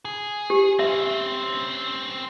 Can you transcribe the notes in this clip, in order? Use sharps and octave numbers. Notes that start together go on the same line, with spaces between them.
G#4
G4
C4 C#4 E5